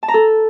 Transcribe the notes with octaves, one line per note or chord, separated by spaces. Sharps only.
A5
A#5
A4